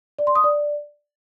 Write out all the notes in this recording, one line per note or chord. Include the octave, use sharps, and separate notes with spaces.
D5
C6
D#6
D5